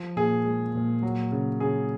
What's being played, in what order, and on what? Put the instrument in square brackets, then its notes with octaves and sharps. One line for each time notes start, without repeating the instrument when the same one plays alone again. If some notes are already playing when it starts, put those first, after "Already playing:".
Already playing: [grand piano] F3
A#2 G#4
G#3
A#2
F#3
C#3
C#3 G#4